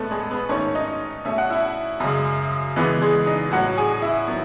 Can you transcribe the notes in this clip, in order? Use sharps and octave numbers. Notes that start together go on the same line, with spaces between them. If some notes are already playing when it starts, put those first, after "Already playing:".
Already playing: A2 G#3 A3 B3 C#4 A4 B4
G#3 G#4
B3 B4
G#2 D#3 A3 C#4 C#5
D#4 D#5
B2 A3 C#4 E5
F#5
E4 E5
F#2 C#3 G#3
C#3 E3 G#3 B3 B4
G#3 G#4
D#4 D#5
A2 F#3 C#4 F#4 F#5
G#4 G#5
E4 E5
D#3 F#3 B3